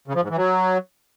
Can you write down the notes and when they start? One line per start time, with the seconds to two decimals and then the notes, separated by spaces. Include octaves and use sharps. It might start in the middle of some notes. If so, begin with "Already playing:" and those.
0.08 C#3
0.15 F3
0.22 G#2
0.30 E3
0.37 F#3